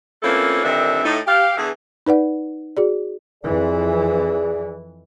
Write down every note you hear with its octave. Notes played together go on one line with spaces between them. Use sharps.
E3 F3 A3 A#3 C4 C#4
G2 A#2 D3 D#3 C4 E5
A2 A3 D#4
G4 F5
E2 D3 E3 G#4
D#4 B4 D5 F#5
F#4 G#4 D5
F2 E3 G#4 D5